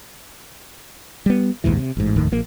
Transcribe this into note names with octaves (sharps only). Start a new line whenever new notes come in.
G3 B3
A#1 D#2 G#2 E3
C3
A1 G#2
F1 D#2 A2 D#3
A#1 A#3